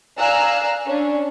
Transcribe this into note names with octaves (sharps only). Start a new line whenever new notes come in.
D5 F5 G#5 A#5 E6 F#6
C#4 D4